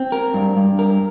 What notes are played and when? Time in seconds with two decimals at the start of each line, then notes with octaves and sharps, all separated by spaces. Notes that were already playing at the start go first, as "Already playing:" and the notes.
Already playing: C4
0.12 A#4
0.34 G2
0.57 G2
0.79 A#4